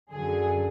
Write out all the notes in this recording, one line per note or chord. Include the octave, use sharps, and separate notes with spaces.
F#2 D3 F#3 G#4